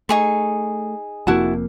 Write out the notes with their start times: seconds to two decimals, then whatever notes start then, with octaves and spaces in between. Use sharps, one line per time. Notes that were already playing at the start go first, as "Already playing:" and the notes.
0.09 A3 D#4 G#4 C#6
1.27 F1 F2 A#3 E4 F#4 A5